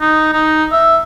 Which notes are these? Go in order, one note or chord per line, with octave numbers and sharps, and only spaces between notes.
D#4
D#4
E5